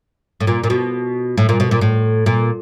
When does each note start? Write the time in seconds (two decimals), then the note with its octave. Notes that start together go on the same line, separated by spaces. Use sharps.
0.40 A2
0.47 A#2
0.64 A#2
0.70 B2
1.38 A2
1.49 A#2
1.60 B2
1.71 A#2
1.81 A2
2.26 A#2